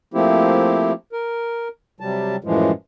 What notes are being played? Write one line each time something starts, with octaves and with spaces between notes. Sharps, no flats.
F3 A3 A#3 C4 E4 G4
A#4
C3 F#3 G3 A5
F#2 A2 E3 F3 G#3